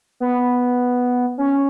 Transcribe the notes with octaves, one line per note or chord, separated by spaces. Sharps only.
B3
C#4